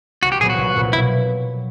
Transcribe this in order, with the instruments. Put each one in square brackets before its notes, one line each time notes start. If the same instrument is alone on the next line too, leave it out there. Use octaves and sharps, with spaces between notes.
[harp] C2 [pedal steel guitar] F#4
[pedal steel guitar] G4
[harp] A#2 F#3 B3 [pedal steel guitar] G#4
[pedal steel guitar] F#4
[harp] C2
A#2 F#3 B3
[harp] B2 [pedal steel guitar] E4